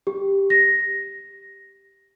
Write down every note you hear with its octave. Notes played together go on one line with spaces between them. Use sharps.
G4
A#6